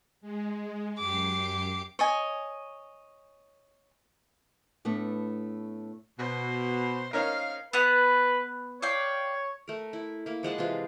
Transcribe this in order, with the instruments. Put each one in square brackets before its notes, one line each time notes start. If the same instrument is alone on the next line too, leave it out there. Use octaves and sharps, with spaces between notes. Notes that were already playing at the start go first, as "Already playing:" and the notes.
[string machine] G#3
[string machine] F#2 C7 [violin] G4 D6
[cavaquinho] C#5 D#5 G#5
[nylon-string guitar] A2 A3 B3 D4
[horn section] B2 [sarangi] C5
[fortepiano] C#4 D#4 A#4 [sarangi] F5
[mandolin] B3 F#5 [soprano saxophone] B4
[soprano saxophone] C#5 [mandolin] D5 F5 G5
[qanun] A3 A#4
E4
A#3 E4
F3 G#3 F#5 A5
C3 E3 F4